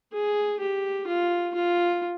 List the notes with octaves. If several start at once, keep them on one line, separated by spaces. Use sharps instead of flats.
G#4
G4
F4
F4